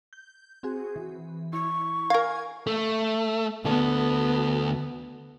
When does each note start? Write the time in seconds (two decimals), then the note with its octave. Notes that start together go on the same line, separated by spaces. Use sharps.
0.13 G6
0.63 C4 F#4 G#4
0.96 E3
1.53 E4 C#6
2.10 A#4 F5 G#5 G#6
2.67 A3
3.65 D2 B3 A4